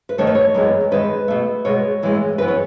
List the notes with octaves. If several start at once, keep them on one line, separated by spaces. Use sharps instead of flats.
B4
D#2 D#3 A3 C#5
B4
C#5
F#2 E3 G#3 B3
E2 D#3 G#3 B4
B2 A3
B2 G#3 B3 C#5
A2 E3 G#3 B3
F#2 E3 B3 B4
C#5